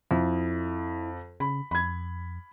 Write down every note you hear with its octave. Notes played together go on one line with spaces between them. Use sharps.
F2 E4
C#3 B5
F2 B5 G#6